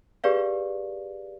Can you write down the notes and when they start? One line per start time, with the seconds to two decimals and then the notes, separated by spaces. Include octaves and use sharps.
0.24 G4 G#4 B4 D5 F5